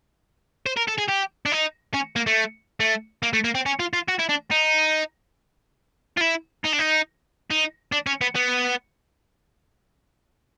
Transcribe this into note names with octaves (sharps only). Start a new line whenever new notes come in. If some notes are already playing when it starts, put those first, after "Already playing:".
C5
A#4
A4
G#4
G4
D4
D#4
C#4
A#3
A3
A3
A#3
A3
A#3
C4
C#4
F4
F4
F#4
E4
D4
D#4
F4
E4
D#4
D4
D#4
D#4
D4
C#4
B3
B3